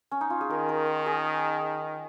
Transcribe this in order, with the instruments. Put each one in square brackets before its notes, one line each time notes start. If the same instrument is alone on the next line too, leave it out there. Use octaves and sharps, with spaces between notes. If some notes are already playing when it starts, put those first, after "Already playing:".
[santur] C#4
D#4
F4
G#4
[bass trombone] D#3 [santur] A#4
[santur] A#4
G#4